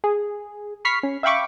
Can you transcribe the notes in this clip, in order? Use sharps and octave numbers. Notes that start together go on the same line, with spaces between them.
G#4
B5 C#6 F6 B6 C7
C#4
E5 F5 G5 B5 C#6 D6